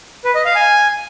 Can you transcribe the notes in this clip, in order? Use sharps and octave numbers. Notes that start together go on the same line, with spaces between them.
B4
D#5
F5
G#5